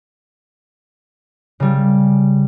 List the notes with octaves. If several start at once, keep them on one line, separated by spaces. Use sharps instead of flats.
C#3 G3